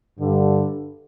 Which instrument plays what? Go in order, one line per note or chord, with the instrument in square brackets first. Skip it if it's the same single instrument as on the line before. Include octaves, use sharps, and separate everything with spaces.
[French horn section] G2 D3